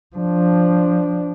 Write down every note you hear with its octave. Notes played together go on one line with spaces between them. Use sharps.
F3 D4